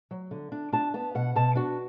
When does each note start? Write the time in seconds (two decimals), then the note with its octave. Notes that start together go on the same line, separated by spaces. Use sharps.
0.11 F#3
0.31 D3
0.52 D4
0.72 D4 A5
0.94 B3 A5
1.15 B2 F#5
1.36 B2 A5
1.55 D4 F#4